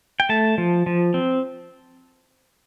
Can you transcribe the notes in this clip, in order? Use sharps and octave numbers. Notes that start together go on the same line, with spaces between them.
G5
A3 A5
F3
F3
C4